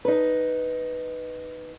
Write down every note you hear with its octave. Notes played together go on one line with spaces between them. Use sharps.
D#4 B4